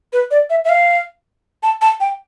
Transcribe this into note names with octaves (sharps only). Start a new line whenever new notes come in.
B4
D5
E5
E5
F5
A5
A5
G5